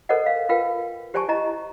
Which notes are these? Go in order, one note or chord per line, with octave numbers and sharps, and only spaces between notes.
A4 A#4 C5 D5 D#5 F#5
F5
F4 A#4 B4 F5 G5
G4 C5 D5 G#5 A5 C#6
E4 D#5 A#5